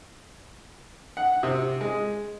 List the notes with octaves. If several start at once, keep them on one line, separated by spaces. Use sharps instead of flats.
F#5
C3
G#3